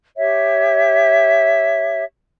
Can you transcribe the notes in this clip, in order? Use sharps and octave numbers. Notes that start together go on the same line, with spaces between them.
G4 C#5 E5